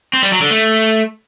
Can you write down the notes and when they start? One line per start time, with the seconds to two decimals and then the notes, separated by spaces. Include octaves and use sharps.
0.13 C4
0.23 G3
0.32 F#3
0.41 D3
0.51 A3